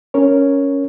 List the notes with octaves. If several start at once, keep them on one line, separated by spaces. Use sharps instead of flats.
C#4 A#4 C#5